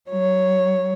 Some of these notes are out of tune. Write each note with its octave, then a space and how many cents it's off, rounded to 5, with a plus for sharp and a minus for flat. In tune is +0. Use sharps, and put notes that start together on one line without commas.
F#3 +20 C#5 +0